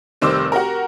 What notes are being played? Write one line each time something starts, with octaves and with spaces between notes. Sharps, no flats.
F1 D#3 G3 C5 D6 E6
F#4 G4 A#4